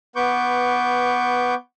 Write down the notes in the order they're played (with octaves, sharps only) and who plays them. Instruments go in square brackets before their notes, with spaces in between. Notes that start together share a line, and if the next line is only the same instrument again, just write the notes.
[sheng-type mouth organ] B3 B4 C#6 D6 G6